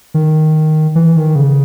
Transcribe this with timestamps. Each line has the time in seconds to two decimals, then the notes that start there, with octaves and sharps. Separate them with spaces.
0.14 D#3
0.95 E3
1.16 D#3
1.36 C#3